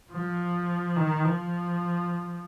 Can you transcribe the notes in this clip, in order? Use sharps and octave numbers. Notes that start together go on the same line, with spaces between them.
F3
D#3
F3